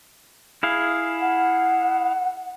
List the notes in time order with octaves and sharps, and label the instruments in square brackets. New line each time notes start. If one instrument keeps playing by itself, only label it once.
[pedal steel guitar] E4 G#4 F5
[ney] F#5